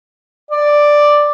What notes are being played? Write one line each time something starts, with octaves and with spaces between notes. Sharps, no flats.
D5